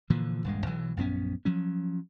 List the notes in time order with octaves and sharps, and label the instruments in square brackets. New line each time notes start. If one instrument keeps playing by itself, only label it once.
[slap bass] A#2 D3 E3 F3
D#1 G2 G#3
B1 E3 F#3
A#1 F#2 B3 C#4
F3 F#3 C#4